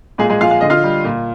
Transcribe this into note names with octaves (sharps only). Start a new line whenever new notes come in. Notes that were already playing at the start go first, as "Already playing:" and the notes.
A#2 G#3 G#4
G#3 G#4
F3 G#3 F4 F5
F5
D3 D#5
F4 F5
G3
A#2